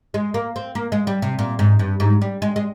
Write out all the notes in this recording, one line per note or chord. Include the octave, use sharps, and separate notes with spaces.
G#3
A#3
C4
A#3
G#3
G3
C3
A#2
G#2
G2
G#2
G3
G#3
G#3